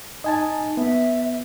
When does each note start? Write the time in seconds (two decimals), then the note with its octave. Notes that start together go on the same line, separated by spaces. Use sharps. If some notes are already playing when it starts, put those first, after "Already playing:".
0.24 D#4 D#5 G#5 A5
0.77 B3 E5